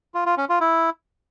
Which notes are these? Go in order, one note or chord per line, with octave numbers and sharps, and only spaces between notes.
F4
F4
C#4
F4
E4